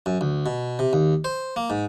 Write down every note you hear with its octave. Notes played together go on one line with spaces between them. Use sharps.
F#2
D2
B2
C3
D#2
C5
A#3
G#2